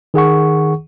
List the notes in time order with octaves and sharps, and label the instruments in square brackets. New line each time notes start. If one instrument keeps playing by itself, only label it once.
[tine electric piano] D#3 G#4 F#5 C#6